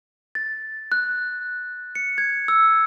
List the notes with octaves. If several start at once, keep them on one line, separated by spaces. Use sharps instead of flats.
A6
F#6
C#7
G#6
E6